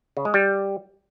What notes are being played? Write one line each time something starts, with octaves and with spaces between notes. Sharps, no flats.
C#3
G#3
G3